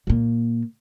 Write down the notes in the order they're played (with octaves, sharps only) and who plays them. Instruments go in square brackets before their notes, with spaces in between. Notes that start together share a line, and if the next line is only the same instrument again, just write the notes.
[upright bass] A#2 A#3